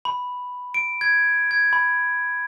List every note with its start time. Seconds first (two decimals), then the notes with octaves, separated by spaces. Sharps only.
0.05 B5
0.74 D7
1.01 G#6
1.51 G#6
1.73 B5